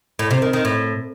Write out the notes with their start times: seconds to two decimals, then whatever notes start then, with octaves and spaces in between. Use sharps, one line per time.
0.19 A2
0.31 C3
0.42 D#3
0.53 D#3
0.65 A2